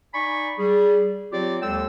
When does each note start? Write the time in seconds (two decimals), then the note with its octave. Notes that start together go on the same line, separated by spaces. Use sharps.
0.14 D#4 D5 G#5 B5 C#6
0.59 G3 G#4
1.32 F#3 C4 F4 G4 C#5 D5
1.62 D#2 G#3 A4 G5 E6